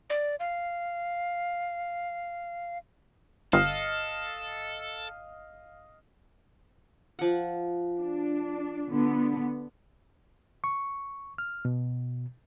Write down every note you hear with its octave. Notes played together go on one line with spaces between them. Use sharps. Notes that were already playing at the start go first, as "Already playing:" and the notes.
D5
F5
G1 A4 D#5 F5
F3 F#5
D4
D3 B3
C#6
F6
B2